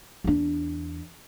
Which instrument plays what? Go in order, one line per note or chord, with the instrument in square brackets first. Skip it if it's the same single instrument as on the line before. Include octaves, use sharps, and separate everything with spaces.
[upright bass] E2 D4